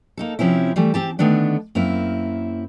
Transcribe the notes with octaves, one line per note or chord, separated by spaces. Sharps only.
A#3 D#4 A4
C3 F3 C4 C#4 E4
E3 G3 A3
C4 G4 A5
D3 D#3 A3 B3 D4
F#2 A#3 C4 E4